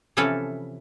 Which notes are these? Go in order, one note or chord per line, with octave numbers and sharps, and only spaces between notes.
C3 E3 F3 C#4 A4 B4